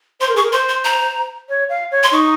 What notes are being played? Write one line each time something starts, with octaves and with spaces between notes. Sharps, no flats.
C5 C6
A#4
G#4 C#6
A#4
C5 C6
C6
A#5
C#5
F5
C#5
C6
D#4 C#6